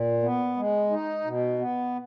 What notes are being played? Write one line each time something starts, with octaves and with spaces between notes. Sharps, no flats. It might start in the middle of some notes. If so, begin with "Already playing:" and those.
Already playing: A#2
B3
G#3
D#4
B2
B3